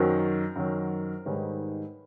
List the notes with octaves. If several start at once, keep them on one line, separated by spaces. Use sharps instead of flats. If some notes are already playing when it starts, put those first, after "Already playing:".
Already playing: F#2 D#3 F#3 A#4 C5
F#2 D#3 F#3
G#2 D#3 G3 B4 C#5